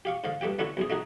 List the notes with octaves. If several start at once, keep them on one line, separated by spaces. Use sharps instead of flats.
G4 F5 C#6
G#2 D3 F5
G2 A3 G4 G5
D3 A3 C#4 E4 F#4 C#6
B1 F#2 G#4
A3 D#4 F#4 G#4